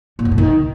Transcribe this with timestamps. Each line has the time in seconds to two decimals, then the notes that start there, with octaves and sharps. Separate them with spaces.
0.19 A#2
0.25 F#2
0.32 B2
0.38 D#3